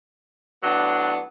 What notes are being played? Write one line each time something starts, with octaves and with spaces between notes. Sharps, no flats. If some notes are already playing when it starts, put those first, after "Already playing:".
A2 F#3 B3 D4